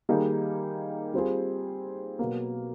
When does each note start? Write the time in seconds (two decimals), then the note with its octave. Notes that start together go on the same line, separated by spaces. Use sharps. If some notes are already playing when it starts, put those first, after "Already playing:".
0.09 D#3 G3 A#3 D#4 G#4
1.14 G3 C4 F4 G#4
2.19 B2 F#3 A#3